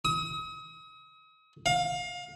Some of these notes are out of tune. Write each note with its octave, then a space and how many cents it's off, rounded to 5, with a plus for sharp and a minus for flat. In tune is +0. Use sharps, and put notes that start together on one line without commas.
D#6 +40
F5 +30